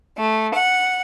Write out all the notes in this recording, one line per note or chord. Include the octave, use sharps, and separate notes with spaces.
A3
F#5